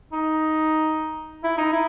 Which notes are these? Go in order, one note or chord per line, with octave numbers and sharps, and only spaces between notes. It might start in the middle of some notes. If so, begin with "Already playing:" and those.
D#4
E4
D#4
E4